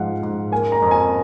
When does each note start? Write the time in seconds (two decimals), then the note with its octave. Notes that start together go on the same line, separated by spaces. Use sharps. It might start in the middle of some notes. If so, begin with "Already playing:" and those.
Already playing: G#2 F3 G#3 F5 F#5
0.23 G#2
0.52 A#3 G#5
0.72 A#5
0.82 F2
0.91 G#5